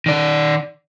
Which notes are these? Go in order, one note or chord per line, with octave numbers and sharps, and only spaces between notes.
D#3 D5